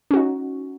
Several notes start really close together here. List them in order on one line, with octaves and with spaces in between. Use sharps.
C#4 F#4 D#4